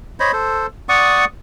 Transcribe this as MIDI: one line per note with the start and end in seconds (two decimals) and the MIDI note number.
0.20 0.32 72
0.20 0.32 73
0.20 0.32 75
0.20 0.32 83
0.33 0.67 69
0.33 0.67 72
0.89 1.25 74
0.89 1.25 78
0.89 1.25 85
0.89 1.25 87